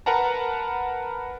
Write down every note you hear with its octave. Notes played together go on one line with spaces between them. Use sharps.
A#4 B4 F#5 A5 A#5